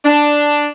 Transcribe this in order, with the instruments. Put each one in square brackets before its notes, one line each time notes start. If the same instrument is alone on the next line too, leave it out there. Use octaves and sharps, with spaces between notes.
[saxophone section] D4